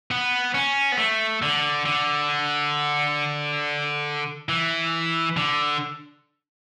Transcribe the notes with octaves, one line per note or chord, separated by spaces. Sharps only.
B3
C#4
B3
A3
D3
D3
E3
D3